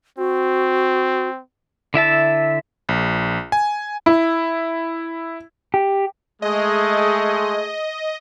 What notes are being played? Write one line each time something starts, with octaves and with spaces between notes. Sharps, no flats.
C4 F#4
D3 E4 E5 A5
A#1
G#5
E4
G4
G#3 A3 G#4 D#5